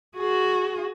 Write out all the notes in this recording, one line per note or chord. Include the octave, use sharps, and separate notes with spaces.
F#4 G#4